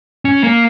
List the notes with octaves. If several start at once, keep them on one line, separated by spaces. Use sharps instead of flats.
C#4
A#3